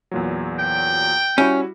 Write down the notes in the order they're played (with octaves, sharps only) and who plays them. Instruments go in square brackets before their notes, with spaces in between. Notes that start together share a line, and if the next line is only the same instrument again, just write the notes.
[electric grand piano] E2 A#2 F#3
[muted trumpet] G5
[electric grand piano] G3 E4 F#4 [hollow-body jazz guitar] C#4